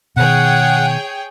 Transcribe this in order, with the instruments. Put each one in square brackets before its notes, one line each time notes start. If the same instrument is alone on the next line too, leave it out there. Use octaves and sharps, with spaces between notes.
[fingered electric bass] B2 D#3 [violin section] G#4 C#5 G5 [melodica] F#5